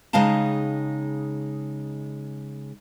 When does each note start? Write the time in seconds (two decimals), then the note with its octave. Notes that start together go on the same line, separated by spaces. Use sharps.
0.13 C#3 G#3 D#4 F5 G5 A5